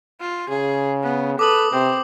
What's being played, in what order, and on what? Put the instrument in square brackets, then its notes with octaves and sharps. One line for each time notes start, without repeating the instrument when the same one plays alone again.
[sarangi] F4
[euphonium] C#3 [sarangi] G#4
[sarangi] B3
[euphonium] A4 [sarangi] B4 [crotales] D6 D#6 F#7
[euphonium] C3 [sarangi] C4